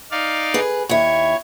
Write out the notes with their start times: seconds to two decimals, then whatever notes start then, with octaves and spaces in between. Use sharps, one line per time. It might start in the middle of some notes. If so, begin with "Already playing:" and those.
0.11 D#4 D5 F5
0.54 G#4 B4
0.89 D#2 E4 C#5